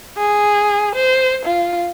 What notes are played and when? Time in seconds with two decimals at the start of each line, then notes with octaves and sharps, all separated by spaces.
0.17 G#4
0.95 C5
1.45 F4